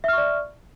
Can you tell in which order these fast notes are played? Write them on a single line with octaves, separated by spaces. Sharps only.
E5 F6 C#6 D5